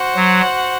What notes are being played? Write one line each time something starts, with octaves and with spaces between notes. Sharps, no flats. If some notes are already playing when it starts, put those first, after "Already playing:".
Already playing: F#4 C5 F#5
F#3